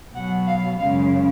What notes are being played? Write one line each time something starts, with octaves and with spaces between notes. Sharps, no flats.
B2 F#3 F#5
F5
F#2 C#3 G#3 F5